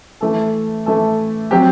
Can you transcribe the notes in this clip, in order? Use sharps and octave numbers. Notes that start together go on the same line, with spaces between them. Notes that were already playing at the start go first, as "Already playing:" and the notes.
E3 A3 E4 A4
E3 A3 E4 A4
F#3 C4 G4